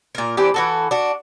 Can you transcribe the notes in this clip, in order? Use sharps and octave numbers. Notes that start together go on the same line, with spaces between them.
A#2 A#4
E3 C4 D4 G4
E3 F#4 A4
D4 F#4